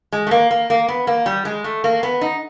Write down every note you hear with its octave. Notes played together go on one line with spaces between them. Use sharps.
G#3
A3
A#3
A#3
A#3
B3
A#3
G3
G#3
A3
A#3
B3
D#4